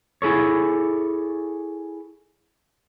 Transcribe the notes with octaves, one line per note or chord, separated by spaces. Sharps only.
E4 G#4 A4 C#5